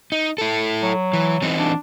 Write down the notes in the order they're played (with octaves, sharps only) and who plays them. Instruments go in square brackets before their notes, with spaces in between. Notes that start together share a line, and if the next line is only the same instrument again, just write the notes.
[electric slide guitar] D#4
E4 A4
[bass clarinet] F#3
[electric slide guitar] E3
E3 C4 D#4
[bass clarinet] D4